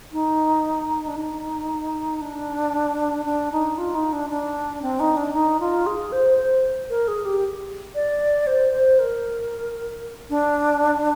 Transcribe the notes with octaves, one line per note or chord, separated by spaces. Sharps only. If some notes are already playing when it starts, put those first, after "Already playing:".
D#4
D4
D#4
D4
D4
D#4
F4
D#4
D4
D4
C4
D#4
D4
D#4
F4
G#4
C5
C5
A#4
G#4
G4
D5
C5
C5
A#4
D4